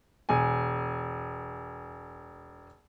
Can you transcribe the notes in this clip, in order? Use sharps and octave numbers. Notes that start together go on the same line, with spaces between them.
E1 G#5